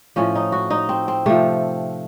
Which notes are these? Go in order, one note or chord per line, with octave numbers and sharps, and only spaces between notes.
A2 F3 C#4
D#4
F#4
D#4
C4
C4
C3 F3 A3